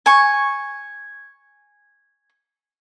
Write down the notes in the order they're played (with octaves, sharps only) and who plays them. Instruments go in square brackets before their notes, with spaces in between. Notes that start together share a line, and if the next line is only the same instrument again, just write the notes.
[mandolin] G#5 C#6